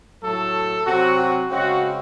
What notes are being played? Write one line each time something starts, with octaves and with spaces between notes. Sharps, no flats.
A2 F#3 A3 A4
C3 F#3 C4 F#4
F#4
C#3 G#3 C4 F#4